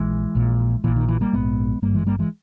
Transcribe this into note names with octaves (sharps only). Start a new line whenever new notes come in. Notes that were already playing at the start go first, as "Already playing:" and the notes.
Already playing: A#1 E3 G#3
A#1 A#2
A#1 A#2 E3
D#3
E3
G3 A#3
A#1 G#2 G#3 B3
G#1 G2 G3 A#3
E3 G#3
G3 A#3
E3 G#3